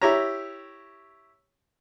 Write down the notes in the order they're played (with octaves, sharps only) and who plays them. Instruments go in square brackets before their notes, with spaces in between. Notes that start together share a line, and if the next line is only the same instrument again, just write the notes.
[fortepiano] E4 G4 C#5 A#5